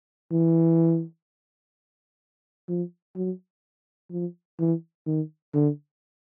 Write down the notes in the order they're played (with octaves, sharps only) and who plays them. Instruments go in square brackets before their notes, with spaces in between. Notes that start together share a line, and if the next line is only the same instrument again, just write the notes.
[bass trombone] E3
F3
F#3
F3
E3
D#3
D3